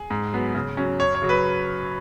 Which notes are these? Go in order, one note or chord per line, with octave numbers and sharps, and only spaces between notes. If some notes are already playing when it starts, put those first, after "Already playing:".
Already playing: G#4
G#2
F#3 B3
C#3
F#3 C#4
F#2 C#5
C#5
C#3 F#3
B4